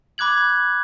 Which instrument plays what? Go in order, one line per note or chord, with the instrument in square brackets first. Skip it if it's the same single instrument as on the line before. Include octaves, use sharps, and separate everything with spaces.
[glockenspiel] B5 D6 F#6 G#6 F#7